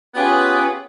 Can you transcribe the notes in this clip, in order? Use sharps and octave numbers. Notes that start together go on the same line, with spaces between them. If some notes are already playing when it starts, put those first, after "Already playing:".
B3 C#4 F4 G4 G#4 B4